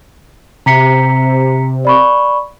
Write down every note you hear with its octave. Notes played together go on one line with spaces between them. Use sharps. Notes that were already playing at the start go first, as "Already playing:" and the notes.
C3 A#5 B6 C#7
D5 B5 C#6